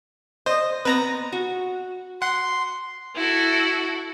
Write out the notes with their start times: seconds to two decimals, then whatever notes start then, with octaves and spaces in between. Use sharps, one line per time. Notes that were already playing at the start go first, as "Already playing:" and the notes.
0.46 C5 D#5
0.85 B3 C4 B4 A#5 A#6
1.32 F#4
2.22 F#5 C6
3.16 E4 F#4 A4